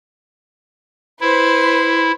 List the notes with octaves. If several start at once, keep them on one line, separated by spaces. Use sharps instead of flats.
E4 B4 C5